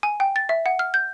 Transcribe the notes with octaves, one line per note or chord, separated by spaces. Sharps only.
G#5
G5
A6
E5
F#5
F6
G6